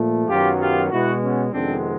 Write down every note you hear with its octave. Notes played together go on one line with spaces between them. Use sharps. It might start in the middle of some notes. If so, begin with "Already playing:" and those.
Already playing: A#2 F3 A3
F#2 D#3 F#3 B3 F4 G4
F4 G4
B2 G#3 B3 E4 F#4
B3 C#4
F2 C3 D#3 G#3 B3 C4 D4